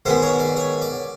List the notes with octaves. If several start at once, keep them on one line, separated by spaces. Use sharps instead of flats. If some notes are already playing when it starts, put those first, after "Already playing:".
G#2 D#3 G#3 B3 C5
C#5
D5
C#5
D5